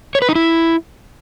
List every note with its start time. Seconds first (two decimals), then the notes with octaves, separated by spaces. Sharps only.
0.15 C#5
0.22 B4
0.29 D#4
0.35 E4